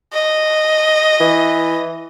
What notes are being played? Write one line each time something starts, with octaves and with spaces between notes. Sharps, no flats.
D#5
E3